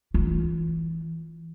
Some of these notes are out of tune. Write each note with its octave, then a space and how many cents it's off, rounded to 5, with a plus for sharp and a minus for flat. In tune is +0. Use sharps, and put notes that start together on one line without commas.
E3 -5 F4 +20